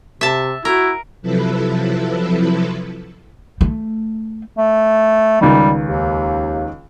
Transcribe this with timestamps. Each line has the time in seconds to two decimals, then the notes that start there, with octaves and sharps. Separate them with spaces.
0.21 C3 E5 A5
0.65 E4 F#4 A#4
1.22 C3 F3 F#3 E4 A4 B4
3.61 A3
4.58 A3
5.41 C#2 D#3 G3
5.85 D#2